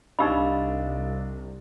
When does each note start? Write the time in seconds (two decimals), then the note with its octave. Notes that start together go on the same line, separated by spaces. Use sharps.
0.19 C2 D4 D#4 G4 D#5 F5 B5 E6